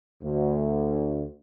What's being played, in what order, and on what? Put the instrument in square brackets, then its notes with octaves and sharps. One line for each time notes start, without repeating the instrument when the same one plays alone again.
[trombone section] D2